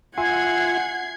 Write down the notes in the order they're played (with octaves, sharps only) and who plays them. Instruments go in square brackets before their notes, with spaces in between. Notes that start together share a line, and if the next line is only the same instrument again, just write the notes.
[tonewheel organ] F4 E5 C6 [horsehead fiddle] F#5 [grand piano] G#5 [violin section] G#6 C7